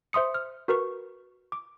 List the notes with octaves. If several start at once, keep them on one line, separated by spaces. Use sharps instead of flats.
C5 E5 C6 D#6 C#7
F6
F#4 A#4 B4 C#6
D6